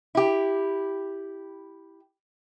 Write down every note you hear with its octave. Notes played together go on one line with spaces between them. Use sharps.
E4 G4